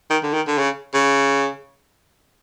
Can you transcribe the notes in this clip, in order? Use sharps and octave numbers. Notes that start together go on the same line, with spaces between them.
D#3
D3
D#3
D3
C#3
C#3